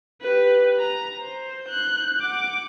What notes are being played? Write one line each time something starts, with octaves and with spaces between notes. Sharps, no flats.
G4 B4
A#5
C5
F#6 G6
F#5 D6